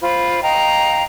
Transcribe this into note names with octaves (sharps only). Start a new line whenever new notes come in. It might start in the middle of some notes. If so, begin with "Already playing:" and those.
F4 C5 B5
D#5 F5 G5 A#5